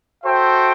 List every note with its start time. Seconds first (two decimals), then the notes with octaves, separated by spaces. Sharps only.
0.24 F#4 A4 C5 E5 G5